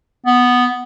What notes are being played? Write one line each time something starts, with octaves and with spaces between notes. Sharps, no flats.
B3